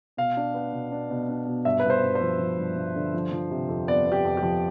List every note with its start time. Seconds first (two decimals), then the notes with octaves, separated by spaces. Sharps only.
0.17 B2 F5
0.37 D4
0.54 B3
0.73 B2
0.92 D4
1.10 B2
1.29 D4
1.47 B2
1.65 G2 E5
1.80 B4
1.85 G2
1.90 C5
2.03 G2
2.15 C5
2.21 F3
2.39 F3
2.59 G2
2.76 G2
2.95 D3
3.14 F3
3.32 F3
3.51 C3
3.69 F2
3.87 B3 D5
4.06 B3
4.12 G4
4.25 F2
4.37 G4
4.43 F3